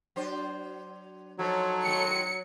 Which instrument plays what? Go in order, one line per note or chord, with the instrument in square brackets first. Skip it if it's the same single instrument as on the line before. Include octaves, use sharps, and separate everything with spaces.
[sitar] F#3 D4 C5
[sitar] F3 [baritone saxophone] F#3 [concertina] D#4 A4 C#5
[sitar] A2 D#3 G#3 [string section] C#7